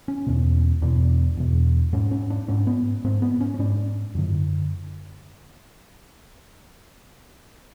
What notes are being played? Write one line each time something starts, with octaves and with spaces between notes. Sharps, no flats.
C#4
E2 B2
E2 B2 D4
E2 B2
G#2 C#4
C#4
D4
G#2 C#4
B3
G#2 C4
B3
C#4
C#4
G#2 D4
F#2 D3